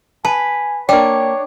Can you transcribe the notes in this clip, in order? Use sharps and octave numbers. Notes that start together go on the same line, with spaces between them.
B4 G#5 A5
A#3 D4 C#5 D5 G5